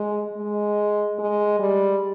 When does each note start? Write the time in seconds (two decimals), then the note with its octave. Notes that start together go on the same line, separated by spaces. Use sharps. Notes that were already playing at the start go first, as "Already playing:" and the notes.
Already playing: G#3
0.37 G#3
1.19 G#3
1.59 G3